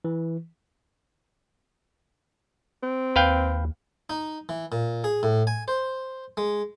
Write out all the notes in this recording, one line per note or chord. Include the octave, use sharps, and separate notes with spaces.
E3
C4
D#2 B4 F5 G5
D#4
E3
A#2
G#4
A2
G#5
C5
G#3